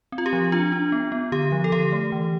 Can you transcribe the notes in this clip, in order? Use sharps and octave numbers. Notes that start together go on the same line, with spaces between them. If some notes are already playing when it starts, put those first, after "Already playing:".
C4
F4
G4
F3
D4 F4
D4
B3
B3
D3 G4
F3
A4
D3 G4
A3
E3